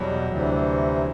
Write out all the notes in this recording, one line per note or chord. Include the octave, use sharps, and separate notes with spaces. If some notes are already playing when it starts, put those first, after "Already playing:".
Already playing: E2 B2 F#3 G3
D2 C3 E3 G3